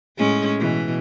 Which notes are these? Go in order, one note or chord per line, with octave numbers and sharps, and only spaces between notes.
A2 G#3 C#4
B2 E3